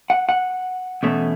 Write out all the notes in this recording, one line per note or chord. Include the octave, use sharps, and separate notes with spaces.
F#5
F#5
E2 B2 A3 C#4